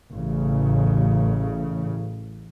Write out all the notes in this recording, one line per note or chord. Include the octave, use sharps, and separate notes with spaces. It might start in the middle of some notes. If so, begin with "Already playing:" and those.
A1 C#3